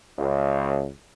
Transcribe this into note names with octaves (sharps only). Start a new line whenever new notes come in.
C#2